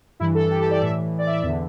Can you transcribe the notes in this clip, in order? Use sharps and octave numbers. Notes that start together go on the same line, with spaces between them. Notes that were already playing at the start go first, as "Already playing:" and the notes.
G2 E3 E4
A4
G4
A4
D5
A2 E3 E5
D5
E5
E2 D3